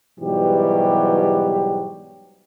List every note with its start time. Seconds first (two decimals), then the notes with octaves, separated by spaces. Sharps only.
0.20 G#2 B2 E3 F#3 G3 G4